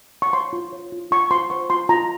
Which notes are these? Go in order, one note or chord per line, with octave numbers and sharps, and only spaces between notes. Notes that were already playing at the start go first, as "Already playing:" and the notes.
C#6
C#5 C6
F4
C#5
F4
F4 C#6
F4 C6
C5 C#6
F4 C6
F4 A#5